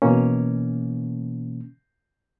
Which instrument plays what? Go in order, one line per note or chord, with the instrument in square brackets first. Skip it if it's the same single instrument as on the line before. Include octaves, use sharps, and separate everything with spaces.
[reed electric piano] B2 E3 A#3 C#4